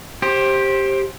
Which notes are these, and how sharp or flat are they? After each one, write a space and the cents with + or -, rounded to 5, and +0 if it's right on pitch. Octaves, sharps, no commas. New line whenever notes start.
G4 +0 C5 +20